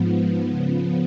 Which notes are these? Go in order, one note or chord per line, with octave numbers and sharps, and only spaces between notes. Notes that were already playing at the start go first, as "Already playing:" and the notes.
Already playing: G#2 F3 B3
C#3 F3 B3